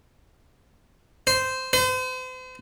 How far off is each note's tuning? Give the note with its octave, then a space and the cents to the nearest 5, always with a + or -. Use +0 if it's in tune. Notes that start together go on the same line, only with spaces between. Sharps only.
C5 -10
C5 -40